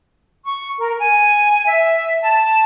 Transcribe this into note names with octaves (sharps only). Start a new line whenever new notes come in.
C#6
A#4
G#5
E5
A5